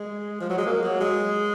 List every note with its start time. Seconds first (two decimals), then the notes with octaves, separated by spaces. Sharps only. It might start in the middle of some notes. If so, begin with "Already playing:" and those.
Already playing: G#3
0.40 F3
0.50 F#3
0.58 G#3
0.66 A#3
0.83 F#3
1.00 G#3